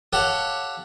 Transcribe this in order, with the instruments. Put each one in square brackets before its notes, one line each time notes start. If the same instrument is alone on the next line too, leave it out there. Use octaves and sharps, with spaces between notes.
[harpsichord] G4 A4 C#5 F5 F#5